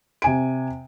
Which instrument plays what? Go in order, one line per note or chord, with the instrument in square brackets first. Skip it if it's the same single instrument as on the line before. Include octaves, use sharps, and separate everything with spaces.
[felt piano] C3 G#5 D7